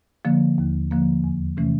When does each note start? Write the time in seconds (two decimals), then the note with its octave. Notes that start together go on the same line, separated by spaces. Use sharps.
0.25 D3 F3 A#3
0.58 D#2
0.91 D3 F3 A#3
1.24 E2
1.57 C3 E3 A3 C#4